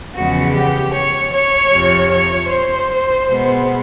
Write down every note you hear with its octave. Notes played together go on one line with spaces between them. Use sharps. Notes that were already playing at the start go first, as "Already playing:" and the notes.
E2 C#3 F3 G#3 B3 F#4
G4
C#5
C#5
F2 C3 F3
C#5
C5
B2 G#3 B3